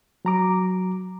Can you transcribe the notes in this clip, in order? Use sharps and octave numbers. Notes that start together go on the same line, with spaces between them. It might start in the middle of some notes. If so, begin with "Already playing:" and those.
F#3 A#5 D6